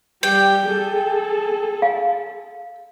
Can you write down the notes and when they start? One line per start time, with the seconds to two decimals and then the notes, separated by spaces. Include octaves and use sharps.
0.23 G3 G4 G5
0.66 G#4 A4
1.82 F5